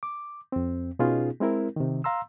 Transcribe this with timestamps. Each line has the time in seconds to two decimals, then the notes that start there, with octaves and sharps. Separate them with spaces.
0.03 D6
0.52 F2 C4
0.99 B2 B3 C#4 D#4 F4 G#4
1.40 G#3 C4 E4 A#4
1.76 C3 D#3
2.04 F5 A#5 C6 E6